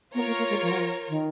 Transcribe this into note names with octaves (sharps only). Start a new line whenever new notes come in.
B3 F4 A#4 C#5
A#3
A#3
G#3
F3
F#3
F3
D#3